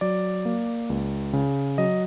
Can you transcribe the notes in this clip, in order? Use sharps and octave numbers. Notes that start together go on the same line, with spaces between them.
F#3 D5
A#3
C#2
C#3
F#3 D#5